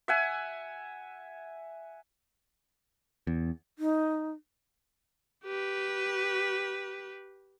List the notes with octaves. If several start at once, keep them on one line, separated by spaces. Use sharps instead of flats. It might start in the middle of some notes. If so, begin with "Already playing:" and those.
E5 F#5 G#5
E2
D#4
G4 B4